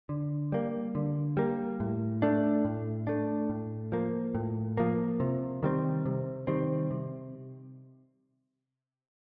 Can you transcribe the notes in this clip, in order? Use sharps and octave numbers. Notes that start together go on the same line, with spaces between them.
D3
G3 A#3
D3
G3 A#3
A2
A3 D4
A2
A3 D4
A2
F3 A#3
A2
F3 A#3
C3
D#3 G3 C4
C3
D#3 G3 C4
C3